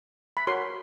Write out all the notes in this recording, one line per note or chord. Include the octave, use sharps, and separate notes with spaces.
B5
F#4 A#4 C#5 C6